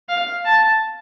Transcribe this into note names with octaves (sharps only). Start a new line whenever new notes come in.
F5
A5